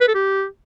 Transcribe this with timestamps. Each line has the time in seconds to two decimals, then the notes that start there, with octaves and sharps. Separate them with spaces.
0.01 B4
0.08 A4
0.15 G4